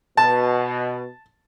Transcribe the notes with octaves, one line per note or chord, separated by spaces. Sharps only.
B2 A5